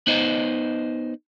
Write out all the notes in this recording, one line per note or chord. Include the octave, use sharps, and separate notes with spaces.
B3 D#4 C5 D#5